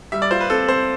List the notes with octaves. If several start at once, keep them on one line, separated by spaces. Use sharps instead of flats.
G3 E5
D5
F4 C5
B4
C4 A4
C4 C5